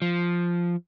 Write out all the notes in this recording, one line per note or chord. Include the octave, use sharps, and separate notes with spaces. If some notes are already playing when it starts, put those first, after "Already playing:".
F3